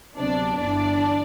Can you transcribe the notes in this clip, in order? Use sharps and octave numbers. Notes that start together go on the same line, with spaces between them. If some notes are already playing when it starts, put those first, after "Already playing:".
D2 C3 F#3 B3 D4 D5
G1 G2 E3 D4 D5